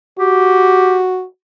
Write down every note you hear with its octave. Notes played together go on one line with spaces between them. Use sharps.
F#4 G4